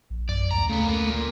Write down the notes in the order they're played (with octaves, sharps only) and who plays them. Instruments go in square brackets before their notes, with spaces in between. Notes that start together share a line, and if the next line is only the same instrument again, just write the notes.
[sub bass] A#1
[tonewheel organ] F#2 [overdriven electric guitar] D5
[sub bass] D2 [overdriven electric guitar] A#5
[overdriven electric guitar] C#3 B3 [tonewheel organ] A3
[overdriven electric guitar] A#3 B3
A#2 A#3